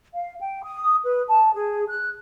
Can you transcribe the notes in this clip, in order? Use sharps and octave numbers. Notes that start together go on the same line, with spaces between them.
F5
G5
D#6
B4
A5
G#4
F#6